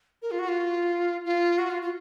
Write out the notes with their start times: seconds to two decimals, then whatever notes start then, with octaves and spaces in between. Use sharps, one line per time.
0.22 A#4
0.31 F4
0.39 F#4
0.48 F4
1.25 F4
1.58 F#4
1.70 F4
1.82 F4